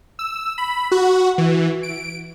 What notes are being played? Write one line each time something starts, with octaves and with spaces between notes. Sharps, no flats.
E6
B5
F#4
E3
D7